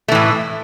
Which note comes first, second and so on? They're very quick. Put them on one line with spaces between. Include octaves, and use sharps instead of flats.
A3 E3 A2